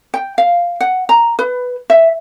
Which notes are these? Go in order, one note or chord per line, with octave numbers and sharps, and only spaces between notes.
G5
F5
F#5
A#5
B4
E5